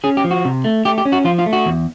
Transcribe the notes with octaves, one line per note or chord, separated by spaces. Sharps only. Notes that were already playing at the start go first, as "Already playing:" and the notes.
C#4 G#4
G4
F3
F#4
C3
A3
A3 G4
G4
C#4
F#4
F3 F4
F4
A3
F#4
E2